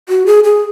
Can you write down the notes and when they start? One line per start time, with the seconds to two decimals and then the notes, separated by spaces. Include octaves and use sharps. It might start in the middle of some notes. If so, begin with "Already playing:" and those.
0.09 F#4
0.26 G#4
0.44 G#4